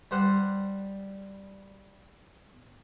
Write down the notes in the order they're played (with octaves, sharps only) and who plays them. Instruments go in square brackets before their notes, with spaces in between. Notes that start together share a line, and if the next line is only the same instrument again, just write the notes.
[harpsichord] G3 C5 F#5